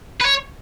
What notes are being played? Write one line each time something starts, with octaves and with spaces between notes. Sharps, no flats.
B4
C#5